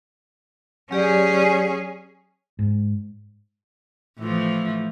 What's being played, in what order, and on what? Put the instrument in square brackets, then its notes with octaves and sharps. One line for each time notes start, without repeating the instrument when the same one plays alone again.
[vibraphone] F#3 G4 D5 [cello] C#4 G#4
[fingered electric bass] G#2
[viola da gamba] A2 E3 F3